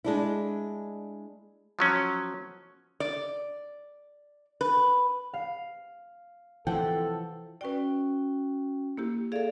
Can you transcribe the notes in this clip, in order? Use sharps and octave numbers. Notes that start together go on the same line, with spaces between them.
G#3 D4 E4
F3 F#3 C#4
D5
B4
F5
C3 E3 F3 A4 F#5 G5
C#4 F#4 B4 D5 G5
A#3 E4 G4
G#4 A4 D5 E5 F5